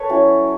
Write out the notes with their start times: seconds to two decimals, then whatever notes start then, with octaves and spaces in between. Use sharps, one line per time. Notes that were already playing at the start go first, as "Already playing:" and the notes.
Already playing: A4 B4 C#5
0.09 F#3 C#4 E4